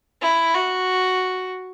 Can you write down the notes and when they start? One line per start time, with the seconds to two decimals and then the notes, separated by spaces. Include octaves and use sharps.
0.21 E4
0.54 F#4